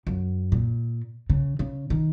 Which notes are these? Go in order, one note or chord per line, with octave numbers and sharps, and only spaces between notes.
F#2
A#2
C#3
C#3
D#3